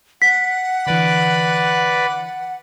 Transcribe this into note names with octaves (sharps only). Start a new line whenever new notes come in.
F#5 B6
D3 E3 B4 D5 B5